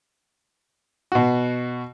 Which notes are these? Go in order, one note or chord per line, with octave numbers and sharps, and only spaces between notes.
B2 F#4